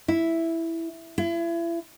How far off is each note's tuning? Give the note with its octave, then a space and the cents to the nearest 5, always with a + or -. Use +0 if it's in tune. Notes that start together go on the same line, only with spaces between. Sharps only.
E4 +0
E4 +35